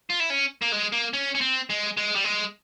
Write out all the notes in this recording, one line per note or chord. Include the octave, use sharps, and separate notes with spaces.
F4
E4
C#4
A#3
G#3
A#3
C#4
C#4
C4
G#3
G#3
G3
G#3